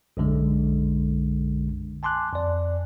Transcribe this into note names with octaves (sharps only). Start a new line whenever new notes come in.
B1 F#2 D3 G#3
G#5 A5 C6 D6 F#6
F2 D5